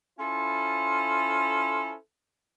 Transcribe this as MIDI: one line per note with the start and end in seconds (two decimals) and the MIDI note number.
0.19 1.94 61
0.19 1.94 64
0.19 1.94 65
0.19 1.94 69
0.19 1.94 72